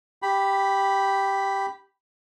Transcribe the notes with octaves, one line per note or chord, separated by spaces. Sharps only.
G4 B5